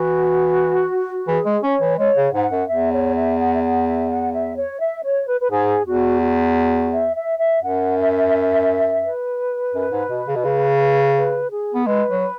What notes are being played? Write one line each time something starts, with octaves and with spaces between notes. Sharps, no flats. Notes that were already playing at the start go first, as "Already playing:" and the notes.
Already playing: E3 F#4
E3 G#4
G#3
C#4 C#5
E3
G#3 C#5
C#3
G#2 F#5
F#2
E2 E5
C#5
E5
F#5
E5
F#5
E5
F#5
E5
C#5
E5
C#5
B4
B4
G#2 G#4
E2 F#4
F#4
E5
E5
E5
F#2 F#5
E5
B4
F#2
G#2
B2
C#3
B2
C#3
B4
G#4
B3
G#3 B4
F#3